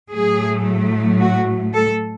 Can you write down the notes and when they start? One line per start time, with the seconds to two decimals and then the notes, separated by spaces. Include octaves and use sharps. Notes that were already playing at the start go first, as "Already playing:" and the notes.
0.13 A2 F#3 A3 G#4
1.20 F#4
1.74 A4